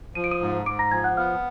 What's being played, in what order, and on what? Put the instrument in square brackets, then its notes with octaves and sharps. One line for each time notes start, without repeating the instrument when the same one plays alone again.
[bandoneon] F3 [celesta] D#7
[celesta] D7
D#6 D#7
[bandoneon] G#2
[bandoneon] G#2 [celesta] D6 D7
[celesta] A#5 A#6
[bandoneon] F3 [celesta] G#5 G#6
[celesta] F#5 F#6
[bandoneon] B3 [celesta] F5 F6